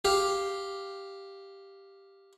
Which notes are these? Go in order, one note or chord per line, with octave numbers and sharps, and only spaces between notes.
G4 F5